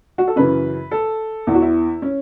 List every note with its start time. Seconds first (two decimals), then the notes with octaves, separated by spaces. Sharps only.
0.18 F#4
0.27 A4
0.36 F#2 C#3 E3 B4
0.91 A4
1.47 E2 E4
1.52 E3 F#4
1.62 E4
2.02 C#4